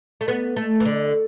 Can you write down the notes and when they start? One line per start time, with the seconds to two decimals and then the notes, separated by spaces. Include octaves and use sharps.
0.21 A3
0.28 B3
0.56 A3
0.80 E3
0.85 D3